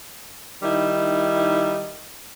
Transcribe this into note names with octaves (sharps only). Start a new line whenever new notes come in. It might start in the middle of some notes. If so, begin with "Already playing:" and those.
D#3 G3 D#4 E4